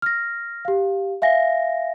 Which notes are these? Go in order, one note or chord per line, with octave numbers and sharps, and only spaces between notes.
F6 A#6
G4 F5
E5 F5 G#5 A#6